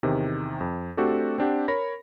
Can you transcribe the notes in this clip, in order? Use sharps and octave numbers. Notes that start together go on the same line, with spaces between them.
E2 C3 D#3
F2
A3 C4 D4 F#4 G4 A4
C4 D4 G4 F#5
A#4 C#5 B5 A#6